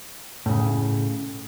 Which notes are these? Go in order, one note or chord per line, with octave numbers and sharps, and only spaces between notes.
A2 C#3